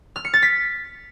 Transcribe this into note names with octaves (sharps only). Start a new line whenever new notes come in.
F6
C#7
A6
B6